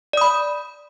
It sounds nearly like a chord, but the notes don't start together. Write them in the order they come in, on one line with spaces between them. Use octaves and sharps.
D5 D#6 B5